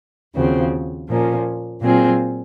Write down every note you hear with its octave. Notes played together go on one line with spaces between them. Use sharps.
D#2 C#3 F3 C4 F#4
A#2 F3 A#3 C#4
A#2 F#3 C4 F4 G#4